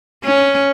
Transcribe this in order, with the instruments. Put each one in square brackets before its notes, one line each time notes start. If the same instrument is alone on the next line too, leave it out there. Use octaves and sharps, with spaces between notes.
[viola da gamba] C#4